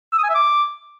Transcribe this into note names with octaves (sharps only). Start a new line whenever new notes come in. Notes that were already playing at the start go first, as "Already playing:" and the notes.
E6
D#6
G#5
E5
D6